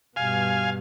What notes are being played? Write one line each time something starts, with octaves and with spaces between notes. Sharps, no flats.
G2 B2 F5 G#5